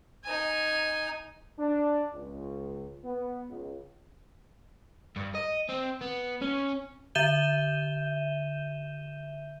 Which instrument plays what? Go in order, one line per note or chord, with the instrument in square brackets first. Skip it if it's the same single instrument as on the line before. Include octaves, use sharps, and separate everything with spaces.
[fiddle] D#4 G#5
[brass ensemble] D4
C#2
B3
C#2
[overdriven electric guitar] G2
D#5
C4
B3
C#4
[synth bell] D3 E5 G6 D#7 E7 G7